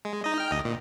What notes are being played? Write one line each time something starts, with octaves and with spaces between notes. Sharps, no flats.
G#3
D#4 D#5
G5 F6
D2 D#5
A#2